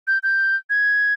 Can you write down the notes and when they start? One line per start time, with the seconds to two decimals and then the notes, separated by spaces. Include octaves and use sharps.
0.07 G6
0.23 G6
0.70 G#6